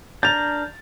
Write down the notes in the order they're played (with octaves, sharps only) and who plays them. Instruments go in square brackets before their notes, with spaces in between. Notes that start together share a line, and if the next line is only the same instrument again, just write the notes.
[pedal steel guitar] D4 A#4 [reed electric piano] G6 [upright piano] A6 F7